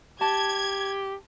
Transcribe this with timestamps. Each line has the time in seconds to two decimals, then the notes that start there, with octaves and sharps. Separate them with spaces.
0.21 G4 A5 G#6